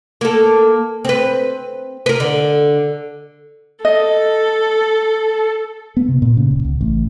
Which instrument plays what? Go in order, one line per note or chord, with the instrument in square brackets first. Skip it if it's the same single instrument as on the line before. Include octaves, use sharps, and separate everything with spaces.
[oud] A#3 A4
C4 B4
A#4 B4
D3
[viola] A4 [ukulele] D#5
[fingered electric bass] B3
C3
A#2
C#3
D1
C#2
A1